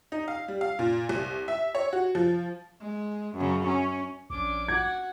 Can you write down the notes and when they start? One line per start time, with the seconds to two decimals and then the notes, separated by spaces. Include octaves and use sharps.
0.12 D#4
0.28 F5
0.48 G3
0.61 F5
0.79 A#2
1.09 C2
1.48 E5
1.75 C#5
1.93 F#4
2.15 F3
2.81 G#3
3.36 F#2 C#3
3.67 C#4
4.30 A#1 C#4 D4 D6
4.68 F#4 F#5 G#6